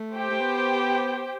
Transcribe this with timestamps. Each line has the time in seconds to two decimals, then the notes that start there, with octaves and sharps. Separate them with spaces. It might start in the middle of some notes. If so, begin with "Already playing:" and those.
Already playing: A3
0.12 G4 C5 G5
0.30 A3
0.40 B3